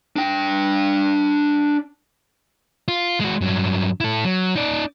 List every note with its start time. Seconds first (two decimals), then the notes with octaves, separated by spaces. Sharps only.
0.16 D4 G5
2.88 F4
3.20 G#3 F#4
3.41 G2 F#3
4.00 E4 A4
4.25 F#3
4.56 D#4 D5